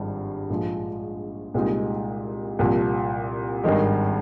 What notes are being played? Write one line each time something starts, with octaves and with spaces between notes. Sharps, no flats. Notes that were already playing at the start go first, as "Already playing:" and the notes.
Already playing: G#1 G2 F3 G#3
A#1 G#2 F3 G#3
C2 A#2 G#3 D#4
C2 A#2 F3
G#1 G2 D#3 G#3